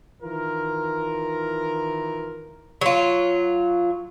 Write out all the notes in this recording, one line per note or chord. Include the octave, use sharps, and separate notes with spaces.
D#3 E3 F4 A#4
F#3 F4